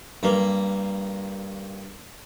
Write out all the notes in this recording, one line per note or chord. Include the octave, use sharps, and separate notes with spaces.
G2 A#3